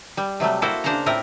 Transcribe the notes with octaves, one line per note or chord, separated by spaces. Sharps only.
G3
C3 F#3 G3 A3
A#3 E4 F#4 A4 C5
C#3 D4 C5 F5 F#5 A#5
A2 C4 E4 F4 A#4 A#5